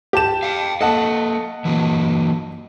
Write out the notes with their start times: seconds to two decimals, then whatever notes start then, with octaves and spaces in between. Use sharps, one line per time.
0.13 G4 A5 E7
0.43 F5 G5
0.81 A#3 A4 D#5 F#5 A5
1.65 E3 F#3 A#3